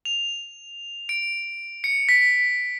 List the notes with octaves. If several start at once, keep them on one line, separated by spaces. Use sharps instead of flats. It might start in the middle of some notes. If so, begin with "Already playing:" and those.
F7
D7
C#7
B6